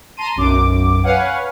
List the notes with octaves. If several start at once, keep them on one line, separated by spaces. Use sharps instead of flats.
A5 A#5 C6 D#7
B1 F#2 D6
B4 C#5 F5 F#5 G#5